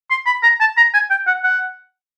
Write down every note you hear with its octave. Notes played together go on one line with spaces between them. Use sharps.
C6
B5
A#5
A5
A#5
G#5
G5
F#5
F#5